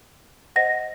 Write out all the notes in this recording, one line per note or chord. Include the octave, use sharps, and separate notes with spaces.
C5 D#5 F#5 A#6